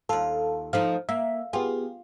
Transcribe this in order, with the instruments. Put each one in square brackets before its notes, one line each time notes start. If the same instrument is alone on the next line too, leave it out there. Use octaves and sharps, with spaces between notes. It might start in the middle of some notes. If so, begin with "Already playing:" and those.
[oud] D#2 F4 [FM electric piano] A4
[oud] F3 A3 D#4 [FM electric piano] F5
[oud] A#3 [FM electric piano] E5
[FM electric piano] B3 G4 G#4 [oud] F4